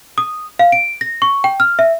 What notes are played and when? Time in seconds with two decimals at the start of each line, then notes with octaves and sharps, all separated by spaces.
0.18 D#6
0.59 F5
0.72 D7
1.01 A#6
1.22 C#6
1.44 G5
1.60 F6
1.79 E5